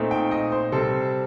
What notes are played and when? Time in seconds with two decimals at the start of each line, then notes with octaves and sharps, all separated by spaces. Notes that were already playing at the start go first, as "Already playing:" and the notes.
Already playing: A#2 A3 C4 D#4
0.11 G5
0.31 D#5
0.52 C5
0.72 C3 G3 C4 A4